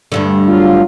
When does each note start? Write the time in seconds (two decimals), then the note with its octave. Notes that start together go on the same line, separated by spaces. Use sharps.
0.12 D2 G2 D3
0.48 F#3 F4